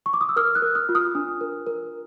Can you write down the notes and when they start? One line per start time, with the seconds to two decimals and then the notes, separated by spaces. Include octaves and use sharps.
0.06 C#6
0.13 D6
0.21 D#6
0.29 E6
0.36 A#4 D#6 F6
0.55 E6 F#6
0.62 A#4
0.75 D#6 F6
0.89 F4
0.95 D#6 F6
1.15 D4
1.41 A#4
1.67 A#4